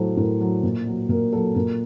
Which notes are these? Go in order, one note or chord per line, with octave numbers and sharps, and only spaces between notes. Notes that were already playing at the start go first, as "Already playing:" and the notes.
Already playing: A2 F#3 A4 C5
A2 A#4
F#3
A#2
F#3
A#2 A#4
F#3 A4
A#2 A#4